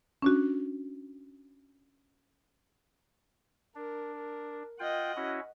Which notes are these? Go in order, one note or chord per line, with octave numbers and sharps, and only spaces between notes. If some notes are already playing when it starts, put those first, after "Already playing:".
C#4 D4 F#4
D4 A#4
A#4
F4 D#5 F#5 G5
C#4 E4 F#4